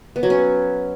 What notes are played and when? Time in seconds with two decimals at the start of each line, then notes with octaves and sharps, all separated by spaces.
0.16 B3
0.23 F#3
0.30 C#4